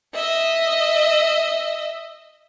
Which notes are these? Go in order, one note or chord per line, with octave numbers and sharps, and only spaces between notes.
D#5 E5